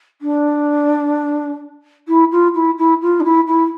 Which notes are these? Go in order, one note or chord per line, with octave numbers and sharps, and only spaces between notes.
D4
E4
F4
E4
E4
F4
D4
E4
E4